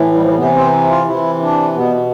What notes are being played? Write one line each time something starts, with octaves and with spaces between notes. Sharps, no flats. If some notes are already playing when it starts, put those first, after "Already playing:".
Already playing: A2 E3
G3
F3
G3
C3 E3 B3
C4
F4
C3 E3 E4
D4
B2 B3